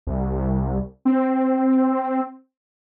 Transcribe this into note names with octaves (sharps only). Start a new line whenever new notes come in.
C2
C4